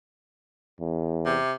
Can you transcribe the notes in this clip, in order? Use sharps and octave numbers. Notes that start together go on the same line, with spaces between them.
E2
C3